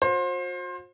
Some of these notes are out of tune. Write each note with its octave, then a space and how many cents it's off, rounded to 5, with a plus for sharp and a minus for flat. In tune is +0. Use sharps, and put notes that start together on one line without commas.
F#4 -45 C5 +25